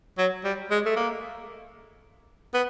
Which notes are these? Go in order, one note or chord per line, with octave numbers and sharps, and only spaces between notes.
F#3
G3
G#3
A3
A#3
B3